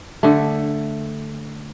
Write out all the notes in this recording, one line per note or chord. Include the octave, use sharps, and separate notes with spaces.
D3 A3